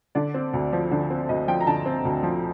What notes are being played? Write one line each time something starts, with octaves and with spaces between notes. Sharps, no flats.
D3 D5
C4
D2
F3
D3
C4
D2 D#5
F3 G5
A#5
D3 A5
C4
D2
F3